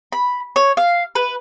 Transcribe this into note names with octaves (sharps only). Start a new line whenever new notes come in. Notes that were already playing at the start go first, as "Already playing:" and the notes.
B5
C#5
F5
B4